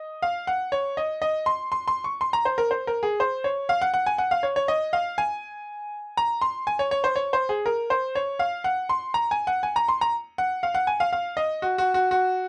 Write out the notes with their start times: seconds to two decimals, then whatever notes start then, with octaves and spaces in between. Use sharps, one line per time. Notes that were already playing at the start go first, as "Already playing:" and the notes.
Already playing: D#5
0.22 F5
0.47 F#5
0.72 C#5
0.97 D#5
1.22 D#5
1.46 C6
1.72 C6
1.88 C6
2.04 C#6
2.21 C6
2.33 A#5
2.45 C5
2.58 A#4
2.71 C5
2.87 A#4
3.03 G#4
3.20 C5
3.44 C#5
3.69 F5
3.81 F#5
3.94 F#5
4.06 G#5
4.18 F#5
4.31 F5
4.43 C#5
4.56 C#5
4.68 D#5
4.93 F5
5.18 G#5
6.17 A#5
6.41 C6
6.67 G#5
6.79 C#5
6.91 C#5
7.04 C5
7.16 C#5
7.33 C5
7.49 G#4
7.66 A#4
7.90 C5
8.15 C#5
8.39 F5
8.64 F#5
8.89 C6
9.14 A#5
9.31 G#5
9.47 F#5
9.63 G#5
9.76 A#5
9.89 C6
10.01 A#5
10.38 F#5
10.63 F5
10.75 F#5
10.87 G#5
11.00 F5
11.13 F5
11.37 D#5
11.62 F#4
11.78 F#4
11.94 F#4
12.11 F#4